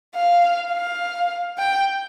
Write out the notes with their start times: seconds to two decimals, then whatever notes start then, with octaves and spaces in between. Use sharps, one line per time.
0.15 F5
0.73 F5
1.58 G5